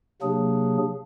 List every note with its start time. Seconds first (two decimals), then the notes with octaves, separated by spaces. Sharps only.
0.22 C3 F#3 A#3 D4 G#4